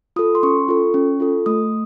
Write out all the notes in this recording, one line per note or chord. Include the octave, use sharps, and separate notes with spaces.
F4 A4 D#6
C6
C#4 C#6
F4 A4
C#4
F4 A4
A3 D#6